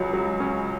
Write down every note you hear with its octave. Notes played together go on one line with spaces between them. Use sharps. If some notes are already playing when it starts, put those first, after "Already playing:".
Already playing: C#2 F#3
F#3
C#4